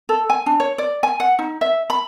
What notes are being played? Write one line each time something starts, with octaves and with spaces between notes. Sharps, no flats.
A4
G#5
D4
C#5
D5
G#5
F#5
D#4
E5
B5